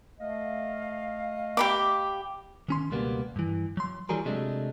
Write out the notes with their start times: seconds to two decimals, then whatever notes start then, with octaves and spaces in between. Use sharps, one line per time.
0.20 A3 D#5 F5
1.57 G4 B5 D6
2.69 D#3 C#4 C6
2.91 C#2 B2 G3 A#3 B3
3.36 G2 E3
3.77 F#3 C6
4.09 E3 F#3 G3 G#4 A#4
4.25 C3 F#3 G#3 A3 D4